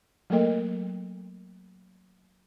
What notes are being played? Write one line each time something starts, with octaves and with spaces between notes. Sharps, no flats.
F#3 A3 A#3 A4 A#4 D#5